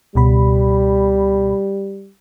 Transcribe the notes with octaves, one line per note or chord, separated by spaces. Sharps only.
C#2 B2 G3 B5